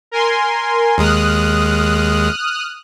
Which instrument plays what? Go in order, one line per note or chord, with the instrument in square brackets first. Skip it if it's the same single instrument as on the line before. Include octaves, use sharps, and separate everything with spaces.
[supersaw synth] A#4 G#5 C6
[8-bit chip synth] D#2 G#3 [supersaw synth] D#6 F6 F#6